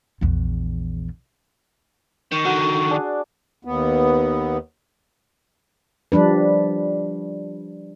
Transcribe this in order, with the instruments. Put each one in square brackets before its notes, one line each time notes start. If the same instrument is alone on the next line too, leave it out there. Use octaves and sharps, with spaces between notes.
[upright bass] A#1 E2
[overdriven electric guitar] D#3 [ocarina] C#6
[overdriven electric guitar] D3 D#3 [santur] F#4 F#5 C6
[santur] D4 G#4
[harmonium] D#2 B3
[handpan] F3 G3 D4 B4